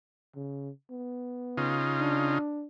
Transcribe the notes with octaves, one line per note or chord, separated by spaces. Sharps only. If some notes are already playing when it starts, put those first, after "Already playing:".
C#3
B3
C#3 D#4 F4
D4